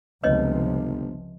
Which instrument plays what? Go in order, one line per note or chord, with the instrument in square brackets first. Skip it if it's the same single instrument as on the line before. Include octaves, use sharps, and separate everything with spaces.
[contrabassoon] G1 [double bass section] C#2 C3 F3 [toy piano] B4 C#5 D#5